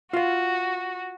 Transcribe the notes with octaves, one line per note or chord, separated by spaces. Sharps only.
F4 F#4 F5